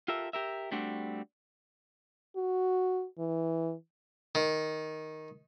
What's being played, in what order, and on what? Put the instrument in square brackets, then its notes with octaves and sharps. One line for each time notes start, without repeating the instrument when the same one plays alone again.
[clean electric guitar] F4 G4 A4 A#4 E5
G4 A#4 E5
G3 A3 C4 D4 F#4
[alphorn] F#4
E3
[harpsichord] D#3